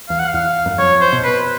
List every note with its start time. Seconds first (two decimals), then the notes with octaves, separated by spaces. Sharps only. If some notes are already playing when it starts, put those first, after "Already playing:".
0.09 E2 F5
0.19 F#5
0.29 F5
0.34 E2
0.66 F#2
0.78 F2 C#5
1.01 C5
1.13 B2
1.24 B4